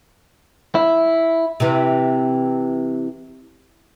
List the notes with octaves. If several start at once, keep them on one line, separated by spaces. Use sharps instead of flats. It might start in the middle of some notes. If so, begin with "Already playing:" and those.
E4
C3 E3